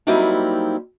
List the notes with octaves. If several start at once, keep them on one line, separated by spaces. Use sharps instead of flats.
F#3 G3 A#3 C4 D#4 E4